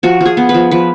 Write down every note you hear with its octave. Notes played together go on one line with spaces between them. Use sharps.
F3 F#4
F3
G#4
B3
B4
F3
F3 B4